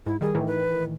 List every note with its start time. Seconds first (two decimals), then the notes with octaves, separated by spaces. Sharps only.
0.06 G#2 E4
0.21 D#3 G3 G#4
0.34 A2 D#3 E3
0.47 B4